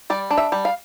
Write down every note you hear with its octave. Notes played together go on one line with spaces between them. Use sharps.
G3 D5
D4
E5
G3
F5